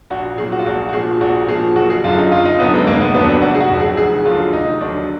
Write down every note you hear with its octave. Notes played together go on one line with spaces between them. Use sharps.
A#1 F#4
A#2 F#3 G#4
F#4
F4
A#1 F#4
F#4
A#2 F3 G#4
A#1 F#4
A#2 F3 G#4
F#1 F#4
G#4
F#2 D3 F4
D#4
F#1 F4
D#4
F#2 D3 B3
G#3
F1 A#3
B3
F2 D3 F#3 B3
D4
F1 F#4
G#4
F#4
F2 D3 F#3
G#4
F1 G#4
D#2 D3 F#3 F4
F1 D#4
D#2 D3 F#3 D4